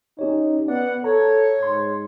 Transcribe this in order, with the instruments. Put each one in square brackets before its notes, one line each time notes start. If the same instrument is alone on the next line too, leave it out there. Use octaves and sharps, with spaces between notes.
[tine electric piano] C#4 G4 C#5 [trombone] D#4
[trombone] B3 [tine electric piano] D5 [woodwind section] F#5
[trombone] A4 [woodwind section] C#5 [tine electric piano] A#5
[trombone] G#2 [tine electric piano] C6